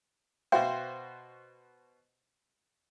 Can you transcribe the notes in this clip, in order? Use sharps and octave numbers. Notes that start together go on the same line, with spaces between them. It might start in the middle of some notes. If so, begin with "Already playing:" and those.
B2 F#4 C5 E5 F5 G5